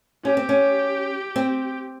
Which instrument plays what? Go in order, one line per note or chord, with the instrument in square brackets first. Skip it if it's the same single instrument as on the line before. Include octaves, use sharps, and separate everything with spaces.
[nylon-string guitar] C#4 [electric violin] G4
[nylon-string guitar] C4
C#4
C4